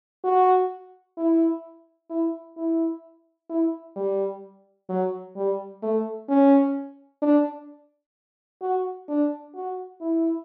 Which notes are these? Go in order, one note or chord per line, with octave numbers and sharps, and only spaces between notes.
F#4
E4
E4
E4
E4
G3
F#3
G3
A3
C#4
D4
F#4
D4
F#4
E4